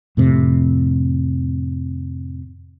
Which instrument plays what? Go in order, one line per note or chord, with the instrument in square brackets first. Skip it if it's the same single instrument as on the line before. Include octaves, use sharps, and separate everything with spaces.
[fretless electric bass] F2 A2 C3